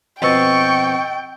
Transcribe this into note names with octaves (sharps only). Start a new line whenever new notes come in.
F2 B2 D#5 G5 C#6 E6 A6